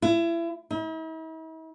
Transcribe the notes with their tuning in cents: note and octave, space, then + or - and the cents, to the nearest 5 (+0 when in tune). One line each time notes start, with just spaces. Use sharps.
E4 +30
E4 -45